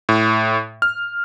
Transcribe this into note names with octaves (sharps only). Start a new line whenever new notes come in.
A2
F6